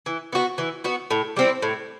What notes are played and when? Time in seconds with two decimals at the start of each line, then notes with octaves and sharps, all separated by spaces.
0.06 E3
0.32 B3 F#4
0.58 E3
0.84 B3 F#4
1.11 A2
1.36 G3 C4 E4
1.62 A2